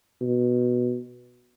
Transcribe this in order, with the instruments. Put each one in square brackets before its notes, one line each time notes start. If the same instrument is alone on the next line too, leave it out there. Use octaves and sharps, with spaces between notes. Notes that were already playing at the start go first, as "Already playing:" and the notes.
[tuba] B2